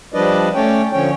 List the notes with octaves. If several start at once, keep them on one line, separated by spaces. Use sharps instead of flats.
F3 G3 D4 B4 D5 D#5
A3 C#4 C#5 D5 G5
D3 F3 C#4 C#5 G5